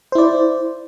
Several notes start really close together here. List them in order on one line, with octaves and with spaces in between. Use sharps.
C5 E4 D5